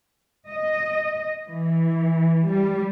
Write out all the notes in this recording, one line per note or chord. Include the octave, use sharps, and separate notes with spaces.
D#5
E3
G3